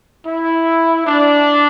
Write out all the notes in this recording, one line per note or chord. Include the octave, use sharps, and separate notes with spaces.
E4
D4